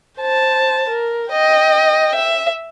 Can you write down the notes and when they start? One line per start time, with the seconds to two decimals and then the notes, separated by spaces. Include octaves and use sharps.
0.19 C5 A5
0.89 A#4
1.31 D#5 G5
2.15 E5